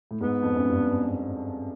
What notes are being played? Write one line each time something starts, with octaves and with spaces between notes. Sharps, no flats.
A2
G#2 B3
F2
F#2
G2